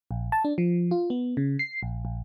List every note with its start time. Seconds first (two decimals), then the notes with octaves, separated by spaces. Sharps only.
0.11 A#1
0.32 A5
0.45 D4
0.58 F3
0.91 F4
1.10 B3
1.37 C#3
1.59 C7
1.83 A#1
2.05 A#1